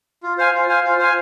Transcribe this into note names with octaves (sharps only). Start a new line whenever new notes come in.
F4
C5 F5 G#5
F4
C5 F5 G#5
F4
C5 F5 G#5